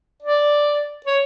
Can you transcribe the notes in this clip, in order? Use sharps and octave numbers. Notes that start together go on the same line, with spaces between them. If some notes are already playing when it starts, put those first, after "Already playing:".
D5
C#5